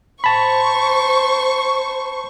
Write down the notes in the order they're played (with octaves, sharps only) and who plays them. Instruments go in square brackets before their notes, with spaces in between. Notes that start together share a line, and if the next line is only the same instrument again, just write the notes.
[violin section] C5 C#6 [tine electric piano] A5 B5